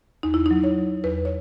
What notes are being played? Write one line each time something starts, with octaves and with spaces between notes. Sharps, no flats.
E2 D#4
E4
F#3 D#4
C#5
F#3
E2 B4
C#5